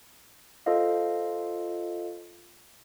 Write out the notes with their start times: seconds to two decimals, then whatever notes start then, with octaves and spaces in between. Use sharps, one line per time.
0.66 F4 A4 C5 D#5 F5